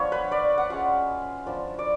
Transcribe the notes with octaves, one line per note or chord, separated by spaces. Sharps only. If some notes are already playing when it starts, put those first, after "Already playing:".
Already playing: F3 B3 D4 F4 C#5 F5
B4
D5
F#5
G#3 C#4 F4 F5
F3 B3 D4 F4
D5